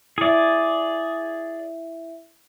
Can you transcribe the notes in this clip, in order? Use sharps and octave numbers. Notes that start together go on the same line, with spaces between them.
E4 G#4 D5 E5